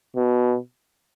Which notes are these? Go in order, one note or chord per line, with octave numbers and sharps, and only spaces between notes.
B2